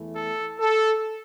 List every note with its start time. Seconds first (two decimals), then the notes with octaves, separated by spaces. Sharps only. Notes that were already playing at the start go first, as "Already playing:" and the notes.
Already playing: E2 E3 A3 E4
0.15 A4
0.60 A4